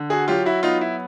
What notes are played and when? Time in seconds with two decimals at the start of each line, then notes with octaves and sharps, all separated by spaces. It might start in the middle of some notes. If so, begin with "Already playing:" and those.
Already playing: D3
0.10 F#4 G#4
0.28 F#3 F4 G4
0.45 E4 F#4
0.63 B3 D#4 F4
0.81 E4